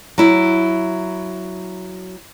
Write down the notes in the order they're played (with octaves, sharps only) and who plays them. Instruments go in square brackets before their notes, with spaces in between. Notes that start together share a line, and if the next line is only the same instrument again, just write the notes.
[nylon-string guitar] F#3 E4